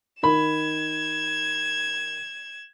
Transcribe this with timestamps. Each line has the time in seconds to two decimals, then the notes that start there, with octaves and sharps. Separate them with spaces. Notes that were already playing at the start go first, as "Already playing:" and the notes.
0.23 D#3 B5 G#6 E7